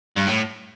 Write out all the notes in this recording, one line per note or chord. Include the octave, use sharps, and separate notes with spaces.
G2
A2